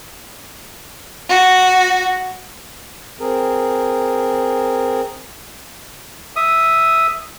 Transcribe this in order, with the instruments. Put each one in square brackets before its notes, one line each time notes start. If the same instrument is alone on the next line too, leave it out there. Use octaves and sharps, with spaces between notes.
[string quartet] F#4
[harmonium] C4 G#4 A#4
[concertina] E5 D#6